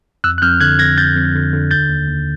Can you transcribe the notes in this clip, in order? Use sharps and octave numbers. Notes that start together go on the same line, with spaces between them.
F2 E6 F#6
F#6
F2 F6 G6
D3 F#6 G#6
F2 G#6 A#6
F2 G6 A6
F2
D3
D3
D#2 G6 A6
D#2
D#2